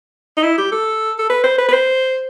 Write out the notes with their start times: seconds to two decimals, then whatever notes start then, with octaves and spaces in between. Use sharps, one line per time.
0.37 D#4
0.43 E4
0.58 G4
0.72 A4
1.18 A4
1.30 B4
1.44 C5
1.58 B4
1.69 B4
1.73 C5